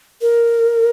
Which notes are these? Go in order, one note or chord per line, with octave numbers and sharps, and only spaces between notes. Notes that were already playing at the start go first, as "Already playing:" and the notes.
A#4